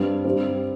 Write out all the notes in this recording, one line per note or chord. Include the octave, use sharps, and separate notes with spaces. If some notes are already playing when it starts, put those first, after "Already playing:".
Already playing: G2 G3 C4
G2 G3 C4